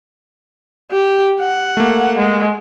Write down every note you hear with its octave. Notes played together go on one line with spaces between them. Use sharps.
G4
F#5
A3 A#3
G#3